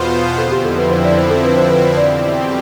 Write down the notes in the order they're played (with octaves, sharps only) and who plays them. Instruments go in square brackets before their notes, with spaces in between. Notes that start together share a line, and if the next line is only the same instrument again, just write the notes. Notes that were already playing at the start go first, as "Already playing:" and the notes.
Already playing: [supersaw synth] E2 B2 B3 F4 C5
[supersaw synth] F2 D3 F3 C4 E4 [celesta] A4
[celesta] G4
A4
B4
C5
D5
C5
A4
B4
C5
B4
C5
[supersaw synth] E2 B2 G3 C4 G4 [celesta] D5